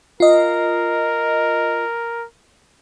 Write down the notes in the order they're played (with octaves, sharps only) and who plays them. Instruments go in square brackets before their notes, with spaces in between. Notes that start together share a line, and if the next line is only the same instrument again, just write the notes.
[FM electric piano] F4 D#5 [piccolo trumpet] A#4